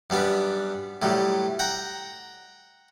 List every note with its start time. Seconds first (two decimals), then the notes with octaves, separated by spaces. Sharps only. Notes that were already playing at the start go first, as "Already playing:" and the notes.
0.10 F#2 G3 B3 D4
1.02 A2 F#3 G3
1.59 F#5 G5 A#5